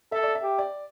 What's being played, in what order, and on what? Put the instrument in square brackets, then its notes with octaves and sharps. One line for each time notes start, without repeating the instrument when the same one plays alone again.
[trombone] A4 [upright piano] E5
[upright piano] D5
E5
[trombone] G4
[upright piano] D5